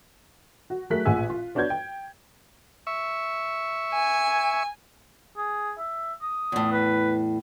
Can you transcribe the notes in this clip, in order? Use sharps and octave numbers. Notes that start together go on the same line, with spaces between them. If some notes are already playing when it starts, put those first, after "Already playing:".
F#4
F#3 A3 G#4 A#4 F#6 B6
A1 A#2 G#4 F#5 G#5 E6
F4
B3 D4 F#4 C#5 G6 G#6
G5
E5 C#6
G#5
G#4
E5
D#6
E2 A2
B4